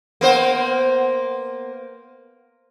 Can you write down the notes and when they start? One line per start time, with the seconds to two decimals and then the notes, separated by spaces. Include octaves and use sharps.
0.21 A#3 B3 C5